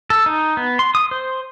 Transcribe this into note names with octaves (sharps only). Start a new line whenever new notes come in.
A4
D#4
B3
C6
D#6
C5